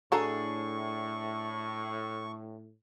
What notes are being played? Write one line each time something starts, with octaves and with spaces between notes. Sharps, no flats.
A2 D4 F#4 G#4 A4 A#5 C#6